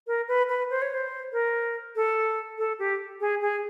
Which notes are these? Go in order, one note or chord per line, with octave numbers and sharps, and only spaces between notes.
A#4
B4
B4
C5
C#5
C5
A#4
A4
A4
G4
G#4
G#4